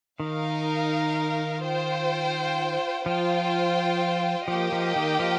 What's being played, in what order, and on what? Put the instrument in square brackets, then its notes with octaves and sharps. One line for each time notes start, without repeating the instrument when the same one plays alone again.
[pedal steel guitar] D#3 [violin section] D#4 A#4 F5
[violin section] F4 C5 G5
[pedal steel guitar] F3 [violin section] F4 C5 G5
[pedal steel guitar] F3 [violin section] A#3 G4 D#5 G5
[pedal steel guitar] F3
D#3
F3